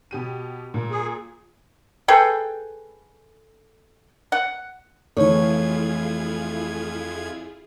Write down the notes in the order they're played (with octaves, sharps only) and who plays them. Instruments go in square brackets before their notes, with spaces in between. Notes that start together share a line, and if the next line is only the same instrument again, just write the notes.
[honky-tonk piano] B2 G4 D#7
A#2
[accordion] G#4
[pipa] G#4 A4 B4 G5
F#5
[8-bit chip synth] F2 G#6 [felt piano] E3 A3 [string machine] E4 F4 G#4 [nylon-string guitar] C#5